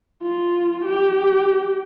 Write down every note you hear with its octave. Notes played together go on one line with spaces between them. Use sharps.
F4
G4